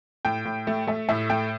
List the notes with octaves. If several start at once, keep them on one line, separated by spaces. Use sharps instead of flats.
A2 G5
A2
A3
A3 E5
A2 E5
A3 G5